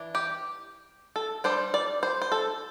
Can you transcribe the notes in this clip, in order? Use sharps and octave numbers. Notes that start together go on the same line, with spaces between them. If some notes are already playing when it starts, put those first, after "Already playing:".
Already playing: E3 D4
G4
A4
G3 D4 C5
D5
C5
C5
A4